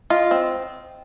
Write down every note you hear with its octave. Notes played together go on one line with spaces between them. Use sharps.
F4 D#5
C4